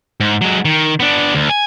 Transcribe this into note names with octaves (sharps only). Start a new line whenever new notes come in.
G#2
F#3 G#3
D#3
B3 D4
D2
G#5